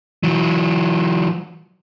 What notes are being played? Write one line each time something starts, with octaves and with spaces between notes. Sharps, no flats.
E3 F#3